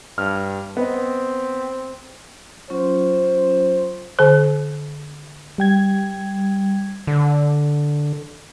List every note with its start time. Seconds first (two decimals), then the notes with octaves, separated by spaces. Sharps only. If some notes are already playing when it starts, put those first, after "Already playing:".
0.18 G2 F6
0.77 B3 C4 D#5
2.70 F#3 C#4 F4 C5
4.19 D3 C5
5.58 G3 G5 G#6
7.07 D3